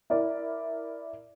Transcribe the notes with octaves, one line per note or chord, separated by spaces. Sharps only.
E4 A#4 D5